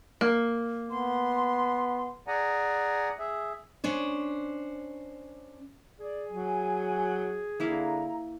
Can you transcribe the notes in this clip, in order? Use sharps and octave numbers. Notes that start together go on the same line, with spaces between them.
A#3
B3 C6
G#4 D5 F#5 G#5 A#5
G#4 E5
C#4 D4 C5
G#4 D5
F#3 G#5
D3 A#3 E4 F5 A#5